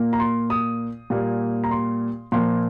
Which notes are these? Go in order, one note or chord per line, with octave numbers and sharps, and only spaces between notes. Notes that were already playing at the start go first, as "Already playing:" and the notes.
Already playing: A#2 A#3
A#5
C6
D#6
A#2 G3 A#3
A#5
C6
A#2 F3 A#3 C6